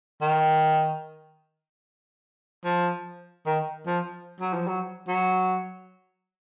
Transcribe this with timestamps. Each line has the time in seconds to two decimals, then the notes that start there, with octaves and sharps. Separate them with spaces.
0.21 D#3
2.65 F3
3.46 D#3
3.86 F3
4.40 F#3
4.54 F3
4.67 F#3
5.08 F#3